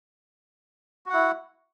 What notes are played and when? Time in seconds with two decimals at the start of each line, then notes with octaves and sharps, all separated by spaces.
1.06 F#4
1.10 F#5
1.13 E4